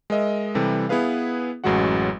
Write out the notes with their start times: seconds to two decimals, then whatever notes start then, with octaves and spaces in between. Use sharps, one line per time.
0.10 G#3 A#4 D#5 E5
0.55 C3 E3 G3 A4
0.89 B3 E4 G#4 B4 F5
1.64 A1 F#2 F#3 G#3 F#4 F#5